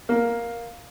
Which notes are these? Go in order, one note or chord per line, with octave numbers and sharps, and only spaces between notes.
A#3